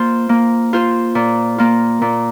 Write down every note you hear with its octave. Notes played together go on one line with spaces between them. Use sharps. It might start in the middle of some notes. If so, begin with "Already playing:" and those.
Already playing: A#3 F4 C5
A#3
F4 C5
A#2
A#3 F4
A#2